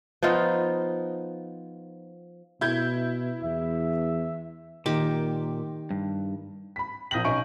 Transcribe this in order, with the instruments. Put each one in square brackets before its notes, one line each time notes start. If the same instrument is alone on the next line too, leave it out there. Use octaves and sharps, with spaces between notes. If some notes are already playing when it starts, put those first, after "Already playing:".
[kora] F3 B3 D#4 F4
[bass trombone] B2 [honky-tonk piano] E4 G6 G#6
[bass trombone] E2 [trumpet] E5
[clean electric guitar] A#2 [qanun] D#3 G4 D6
[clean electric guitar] G2
[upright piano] B5 B6
A#1 D#6 G6 A#6 B6 F#7
B1 C#4 D#5 G#5 C#6 D7